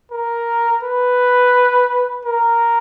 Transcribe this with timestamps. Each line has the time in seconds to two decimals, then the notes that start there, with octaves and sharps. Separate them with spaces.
0.11 A#4
0.83 B4
2.25 A#4